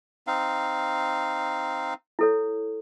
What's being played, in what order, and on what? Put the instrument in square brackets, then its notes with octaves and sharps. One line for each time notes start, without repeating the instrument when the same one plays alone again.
[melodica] C4 D#4 F5
[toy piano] E4 A4 C#5